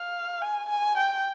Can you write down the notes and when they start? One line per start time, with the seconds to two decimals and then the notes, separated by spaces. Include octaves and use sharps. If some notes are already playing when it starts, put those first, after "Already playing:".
Already playing: F5
0.42 G#5
0.69 G#5
0.98 G5